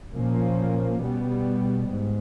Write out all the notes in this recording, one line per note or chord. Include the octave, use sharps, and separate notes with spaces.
A#2 F3 A#3 C#4
B2 G3 B3
G#2